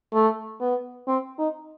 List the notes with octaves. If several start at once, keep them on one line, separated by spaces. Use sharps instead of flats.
A3
B3
C4
D#4